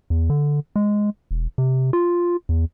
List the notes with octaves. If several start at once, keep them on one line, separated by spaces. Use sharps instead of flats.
E2
D3
G#3
E1
C3
F4
E2